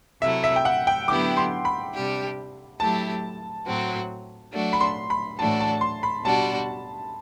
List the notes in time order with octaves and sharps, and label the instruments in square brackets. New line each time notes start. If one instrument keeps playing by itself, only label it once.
[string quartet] C3 F#3 A3 E4 [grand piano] E5
[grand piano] E5
G5
F#5
G5
[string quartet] D3 F#3 B3 E4 G4 [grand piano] D6
[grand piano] C6
B5
[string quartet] C3 G3 D4 G4
[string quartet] F#3 A3 E4 G4 [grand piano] A5
[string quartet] A2 F#3 C4 F#4
F#3 A3 D4 F#4
[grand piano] B5
C6
B5
[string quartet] A2 E3 A3 D4 F#4 [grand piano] A5
[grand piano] A5
C6
B5
[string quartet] B2 G3 D4 F#4 [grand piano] A5